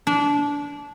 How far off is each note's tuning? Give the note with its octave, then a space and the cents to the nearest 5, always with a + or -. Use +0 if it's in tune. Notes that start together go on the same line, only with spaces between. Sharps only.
D4 -20